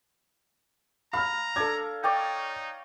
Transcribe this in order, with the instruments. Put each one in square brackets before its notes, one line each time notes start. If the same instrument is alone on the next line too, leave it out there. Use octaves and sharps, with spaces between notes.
[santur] F5 [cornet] A#5 [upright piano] B5 F6
[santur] D4 [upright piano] A4 G#6
[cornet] D#4 [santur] C#5 D5 G5